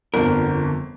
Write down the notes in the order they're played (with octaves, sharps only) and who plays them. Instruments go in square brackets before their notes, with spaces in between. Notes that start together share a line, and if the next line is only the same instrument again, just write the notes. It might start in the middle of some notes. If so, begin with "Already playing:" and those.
[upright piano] G1 F2 [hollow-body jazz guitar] D3 B3 A#4